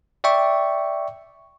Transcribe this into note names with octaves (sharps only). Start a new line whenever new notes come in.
D5 E5 G5 C#6